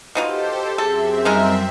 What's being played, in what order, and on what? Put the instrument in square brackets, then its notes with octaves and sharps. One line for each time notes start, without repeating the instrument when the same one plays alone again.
[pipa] B2 D#4 F4 [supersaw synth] G4 A4 C5
[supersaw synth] F#2 C4 E5 [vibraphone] G#4 [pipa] A4
[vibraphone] G3 [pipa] G#3 D#4 A#4